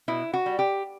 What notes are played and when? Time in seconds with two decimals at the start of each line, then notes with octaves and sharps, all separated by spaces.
0.08 B2 E4
0.34 F#4
0.46 G3
0.59 G4